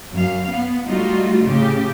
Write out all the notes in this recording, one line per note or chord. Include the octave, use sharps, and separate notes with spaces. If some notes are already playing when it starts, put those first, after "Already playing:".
F#2 F5
B3
G3 A3 D#4 F4 F#4
A2 C#3 G4